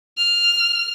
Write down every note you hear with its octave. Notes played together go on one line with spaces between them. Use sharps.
F6